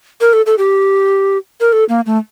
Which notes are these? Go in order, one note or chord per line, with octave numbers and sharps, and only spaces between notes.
A#4
A4
A4
G4
A#4
A4
A#3
A3